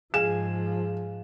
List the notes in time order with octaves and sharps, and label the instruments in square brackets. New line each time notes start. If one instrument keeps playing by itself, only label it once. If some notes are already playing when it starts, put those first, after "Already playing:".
[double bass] G#2 F3 [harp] G#4 F5 G#5 [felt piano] E7